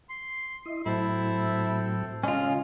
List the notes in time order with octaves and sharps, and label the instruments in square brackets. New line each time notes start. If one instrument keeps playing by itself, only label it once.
[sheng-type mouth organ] C6
[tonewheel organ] E4 D#5
[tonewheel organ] A2 F#3 [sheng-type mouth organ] C4 A4 [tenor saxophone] E4
[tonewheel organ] C#3 [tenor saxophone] G#3 [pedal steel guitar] C#4 F4